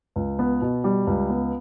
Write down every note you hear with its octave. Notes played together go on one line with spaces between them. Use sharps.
C#2
B3
B2
G3
C#2
B3